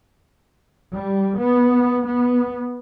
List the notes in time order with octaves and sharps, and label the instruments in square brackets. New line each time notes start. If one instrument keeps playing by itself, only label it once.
[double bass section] G3
B3
B3